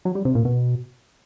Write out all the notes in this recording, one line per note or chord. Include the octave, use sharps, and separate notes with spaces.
F#3
G3
C3
A#2
B2